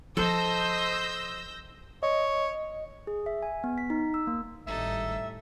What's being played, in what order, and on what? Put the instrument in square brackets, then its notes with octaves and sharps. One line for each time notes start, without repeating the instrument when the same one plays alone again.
[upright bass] F3 E4 [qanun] A4 [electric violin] C5 D#5 [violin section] E6 G6 A#6
[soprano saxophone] C#5 [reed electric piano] D#5
[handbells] G#4
E5
G#5
B3
B6
D#4
E6
A#3
[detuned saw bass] G#1 [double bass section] A2 G3 A3 [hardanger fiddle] D#4 A4 [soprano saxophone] E5